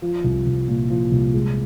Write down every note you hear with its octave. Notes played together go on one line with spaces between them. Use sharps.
F3
C2
C2
A#2
F3
C2
G#3